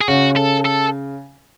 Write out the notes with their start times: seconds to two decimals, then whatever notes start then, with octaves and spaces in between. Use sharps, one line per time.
0.01 G#4
0.08 C#3 F#4
0.36 A4
0.65 A4